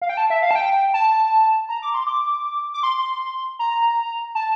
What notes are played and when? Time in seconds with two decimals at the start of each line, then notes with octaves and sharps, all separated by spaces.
0.02 F5
0.09 G5
0.17 A5
0.30 E5
0.42 F5
0.51 A5
0.55 G5
0.94 A5
1.69 A#5
1.82 D6
1.94 C6
2.07 D6
2.74 D6
2.83 C6
3.59 A#5
4.35 A5